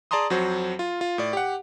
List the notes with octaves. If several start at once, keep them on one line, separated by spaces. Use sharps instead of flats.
G#4 D5 A5 A#5 C6 D#6
F2 F#3 F#4 C5
F4
F4
A2 D5
G4 F#5